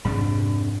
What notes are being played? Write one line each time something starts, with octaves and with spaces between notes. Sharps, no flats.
F2 G#2 C3 D4